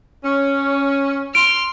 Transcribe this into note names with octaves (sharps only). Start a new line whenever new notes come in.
C#4
C6 F6 D7